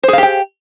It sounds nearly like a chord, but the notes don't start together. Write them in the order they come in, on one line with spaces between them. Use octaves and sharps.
C5 G#4 F5 G4 G5